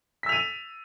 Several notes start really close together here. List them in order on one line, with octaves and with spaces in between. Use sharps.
B6 E6 F7 D#7